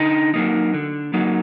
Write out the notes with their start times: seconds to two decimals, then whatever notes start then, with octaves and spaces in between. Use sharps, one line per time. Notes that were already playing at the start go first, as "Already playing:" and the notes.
Already playing: D3 D#4
0.34 F#3 A#3 D#4
0.74 D3
1.14 F#3 A#3 D#4